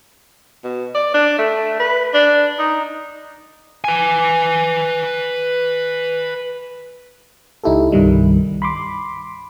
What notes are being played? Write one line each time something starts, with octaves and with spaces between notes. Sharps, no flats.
B2
D5
D4
A3
B4
D4
D#4
B4 G#5
C#2 D#4 E4 G4 A4
C2 G2 D#3 G3
B5 C6 D6